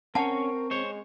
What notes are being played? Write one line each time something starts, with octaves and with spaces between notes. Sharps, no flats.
C4 C#4 A#4 C#5 F#5 A5 A#5 C#6
G#3 C5 C#5